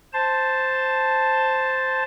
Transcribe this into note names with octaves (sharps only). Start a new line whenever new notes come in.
C5 A5